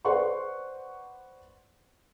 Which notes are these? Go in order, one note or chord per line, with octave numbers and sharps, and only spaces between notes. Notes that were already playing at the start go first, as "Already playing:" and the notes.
B4 C5 D5 F#5 C6 C#6